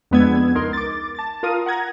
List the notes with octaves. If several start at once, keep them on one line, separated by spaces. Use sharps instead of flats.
F2 G#3 B3 D4 E6 G#6
C#2 D#4 A#4 C6
D6 A6
A5 A6
F4 A#4 F5 D#6
F#5 A#5 G#6 A#6